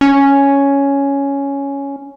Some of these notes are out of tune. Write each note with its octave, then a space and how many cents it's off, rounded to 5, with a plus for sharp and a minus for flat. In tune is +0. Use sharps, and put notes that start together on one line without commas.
C#4 +5